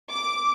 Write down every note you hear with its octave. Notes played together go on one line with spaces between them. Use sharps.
D6